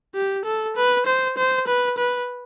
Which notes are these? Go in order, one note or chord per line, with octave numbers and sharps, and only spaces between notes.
G4
A4
B4
C5
C5
B4
B4